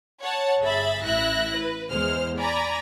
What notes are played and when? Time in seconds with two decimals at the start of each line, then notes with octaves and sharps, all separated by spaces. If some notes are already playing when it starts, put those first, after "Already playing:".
0.22 C#5 F#5 A5
0.61 G1 G#4 E5 B5 A6
1.04 A1 E4 E5 F#6 A#6
1.56 B4
1.90 E2 G#3 C5 F6
2.37 D5 G#5 A#5 B5